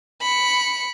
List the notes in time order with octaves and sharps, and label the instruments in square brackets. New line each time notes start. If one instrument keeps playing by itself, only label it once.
[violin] B5 C#7